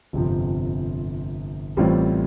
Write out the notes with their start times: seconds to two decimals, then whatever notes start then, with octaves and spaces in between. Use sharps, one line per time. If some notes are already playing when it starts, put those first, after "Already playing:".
0.13 G1 F2 C3 F3
1.77 A1 A2 G3 C4 F4